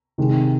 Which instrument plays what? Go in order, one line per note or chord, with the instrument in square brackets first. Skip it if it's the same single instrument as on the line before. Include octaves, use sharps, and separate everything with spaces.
[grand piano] C3 D#3 G#3